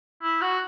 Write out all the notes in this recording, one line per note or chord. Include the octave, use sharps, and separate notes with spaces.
E4
F#4